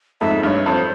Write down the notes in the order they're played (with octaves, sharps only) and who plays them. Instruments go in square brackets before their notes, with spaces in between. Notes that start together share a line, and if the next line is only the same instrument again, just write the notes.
[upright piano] F2 G#2 [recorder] E5
[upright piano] G2 [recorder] E5
[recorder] C#5
[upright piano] F2 [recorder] C#5
[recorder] C5